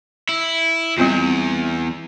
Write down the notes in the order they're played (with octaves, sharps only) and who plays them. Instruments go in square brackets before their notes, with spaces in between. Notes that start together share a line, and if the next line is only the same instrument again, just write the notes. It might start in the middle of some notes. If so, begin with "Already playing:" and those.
[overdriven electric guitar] E4
[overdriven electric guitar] E2 [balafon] G3 C4 F4